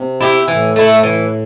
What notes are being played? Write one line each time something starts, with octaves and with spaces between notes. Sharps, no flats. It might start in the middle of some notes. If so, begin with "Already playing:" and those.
Already playing: C3
E4 G4
A2 E3
A3 E4
E3